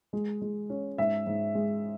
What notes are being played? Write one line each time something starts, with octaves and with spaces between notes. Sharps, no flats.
G#3
G#3
C#4
G#2 E5
G#2
G#3